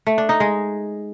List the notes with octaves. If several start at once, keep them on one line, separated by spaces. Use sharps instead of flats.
A3
D4
D#4
G#3